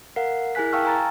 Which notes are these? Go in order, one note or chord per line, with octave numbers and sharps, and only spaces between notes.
A#4 F5 F#5 C7
E4 G#4 A#4 G#5 F#6 B6
F5 G5 A5 C#6 E6 F6
G#5 A#5 A6